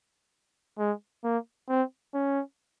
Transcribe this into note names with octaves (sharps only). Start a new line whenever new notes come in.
G#3
A#3
C4
C#4